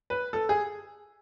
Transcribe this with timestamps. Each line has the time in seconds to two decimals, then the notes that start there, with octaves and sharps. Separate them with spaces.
0.10 B4
0.33 A4
0.49 G#4